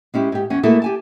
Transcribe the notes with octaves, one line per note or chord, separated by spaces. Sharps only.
G#3 C#4 E4 G4
G#2 G4
E2 C#4
A3 A#3 E4 F#4 G#4 A4
G4 G#5 A5